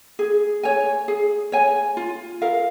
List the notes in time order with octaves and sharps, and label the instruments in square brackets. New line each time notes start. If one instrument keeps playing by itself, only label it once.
[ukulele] G#4
C#5 G#5
G#4
C#5 G#5
F4
A#4 F5